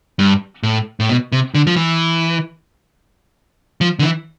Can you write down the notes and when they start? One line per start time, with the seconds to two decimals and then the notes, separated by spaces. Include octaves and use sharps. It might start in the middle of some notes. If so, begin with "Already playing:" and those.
0.19 G2
0.63 A2
1.00 A2
1.09 B2
1.32 C3
1.54 D3
1.67 F3
1.76 E3
3.81 F3
3.99 D3
4.03 E3